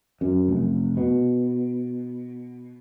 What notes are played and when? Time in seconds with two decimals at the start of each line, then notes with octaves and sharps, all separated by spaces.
0.21 F#2
0.48 F1
0.97 B2